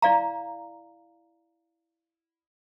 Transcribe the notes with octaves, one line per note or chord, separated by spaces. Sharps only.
E4 D5 F5 A#5